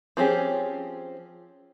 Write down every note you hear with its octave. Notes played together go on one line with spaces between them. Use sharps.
F3 C4 C#4 G4 G#4